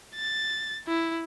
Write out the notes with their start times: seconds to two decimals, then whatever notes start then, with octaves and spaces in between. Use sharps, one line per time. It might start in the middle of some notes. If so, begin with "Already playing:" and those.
0.16 A6
0.88 E4